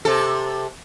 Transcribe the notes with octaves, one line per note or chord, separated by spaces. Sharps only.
C3 A4